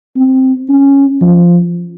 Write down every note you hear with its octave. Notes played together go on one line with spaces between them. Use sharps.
C4
C#4
F3